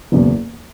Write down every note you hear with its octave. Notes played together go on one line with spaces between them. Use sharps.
F#1 E2 B2